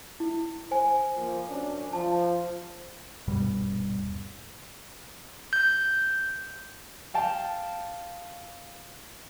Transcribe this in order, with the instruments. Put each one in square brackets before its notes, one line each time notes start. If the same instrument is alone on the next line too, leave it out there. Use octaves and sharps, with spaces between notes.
[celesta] E4
C5 G#5
[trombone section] F3 A#3
F#2 C#4 D4
[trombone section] F3 [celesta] A5
[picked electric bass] D#1 G2 B2 G3
[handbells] G6
[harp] F5 G5 A5